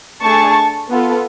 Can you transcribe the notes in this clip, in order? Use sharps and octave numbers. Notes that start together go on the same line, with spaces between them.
A3 D4 G#4 A5 C#6
B3 F4 A4